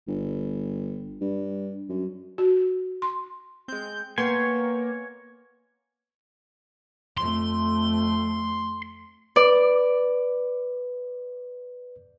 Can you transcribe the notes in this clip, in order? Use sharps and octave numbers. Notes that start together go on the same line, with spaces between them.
G1
G2
F#2
F#4
C6
G#3 C4 G6
A#3 B3 C#5 G5 G#5 C6
F2 A3 C6
B4 D5